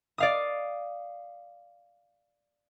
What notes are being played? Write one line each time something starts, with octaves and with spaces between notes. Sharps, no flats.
D5 F5 D#6